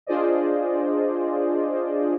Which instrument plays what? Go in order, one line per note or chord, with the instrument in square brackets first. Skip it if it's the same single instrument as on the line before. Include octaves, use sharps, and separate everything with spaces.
[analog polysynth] D4 F4 G#4 C5 D5 D#5